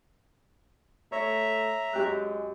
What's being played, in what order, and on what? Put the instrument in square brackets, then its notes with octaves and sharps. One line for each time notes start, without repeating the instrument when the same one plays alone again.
[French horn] A3 [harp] C#5 [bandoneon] E5 A#5
[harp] F#2 G4 F#6 [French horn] G#3